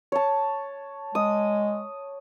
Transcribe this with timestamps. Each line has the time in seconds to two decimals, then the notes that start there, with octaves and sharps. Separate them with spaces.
0.12 C#5 A5
1.15 G#3 D#6